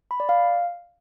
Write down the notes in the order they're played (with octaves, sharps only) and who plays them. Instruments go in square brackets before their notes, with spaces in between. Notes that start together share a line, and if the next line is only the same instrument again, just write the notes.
[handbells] B5
D5
F5